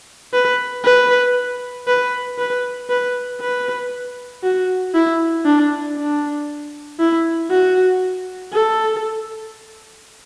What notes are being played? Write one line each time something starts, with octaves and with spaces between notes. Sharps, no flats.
B4
B4
B4
B4
B4
B4
F#4
E4
D4
D4
E4
F#4
A4